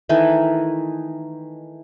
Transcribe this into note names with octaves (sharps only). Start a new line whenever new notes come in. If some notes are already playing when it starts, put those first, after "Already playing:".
D#3 E3 A3 D#4